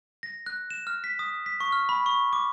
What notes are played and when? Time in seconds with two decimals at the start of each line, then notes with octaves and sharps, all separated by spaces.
0.23 A#6
0.46 F#6
0.71 E7
0.87 F6
1.04 B6
1.19 D#6
1.46 B6
1.60 C#6
1.72 F6
1.89 B5
2.06 C#6
2.33 D6